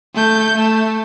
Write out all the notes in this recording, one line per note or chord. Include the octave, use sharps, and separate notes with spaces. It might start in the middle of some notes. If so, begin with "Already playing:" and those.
A3 G6
A3